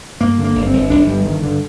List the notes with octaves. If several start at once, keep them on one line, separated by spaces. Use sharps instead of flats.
G2 A#3
D3
A#3
G1
C4
G1
G1 D4
G2 G3
G2 D#3
G2 D3